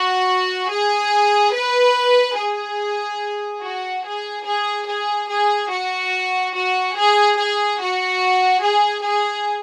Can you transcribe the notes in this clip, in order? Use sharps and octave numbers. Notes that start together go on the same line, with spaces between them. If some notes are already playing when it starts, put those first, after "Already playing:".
Already playing: F#4
G#4
B4
G#4
F#4
G#4
G#4
G#4
G#4
F#4
F#4
G#4
G#4
F#4
G#4
G#4